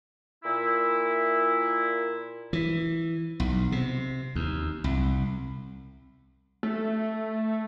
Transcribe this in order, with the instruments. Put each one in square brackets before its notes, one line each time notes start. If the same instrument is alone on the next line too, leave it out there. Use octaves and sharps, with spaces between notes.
[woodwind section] A#2 E4
[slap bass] E3
B1
C3
D#2
C2
[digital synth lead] A3